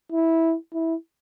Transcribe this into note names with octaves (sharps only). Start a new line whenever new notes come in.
E4
E4